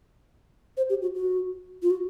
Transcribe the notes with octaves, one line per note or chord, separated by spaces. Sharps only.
C5
G4
F#4
F#4
F4
F#4